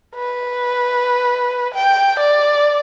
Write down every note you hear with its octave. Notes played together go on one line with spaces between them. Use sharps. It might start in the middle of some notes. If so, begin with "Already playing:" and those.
B4
G5
D5